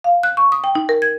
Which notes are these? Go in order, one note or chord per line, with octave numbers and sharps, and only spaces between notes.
F5
F#6
C#6
D#6
G5
D#4
A#4
G#6